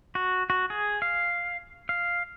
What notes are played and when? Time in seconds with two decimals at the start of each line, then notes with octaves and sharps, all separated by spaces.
0.15 F#4
0.50 F#4
0.70 G#4
1.02 F5
1.89 F5